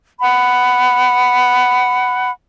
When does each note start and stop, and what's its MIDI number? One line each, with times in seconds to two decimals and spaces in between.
0.20 2.30 78
0.20 2.30 83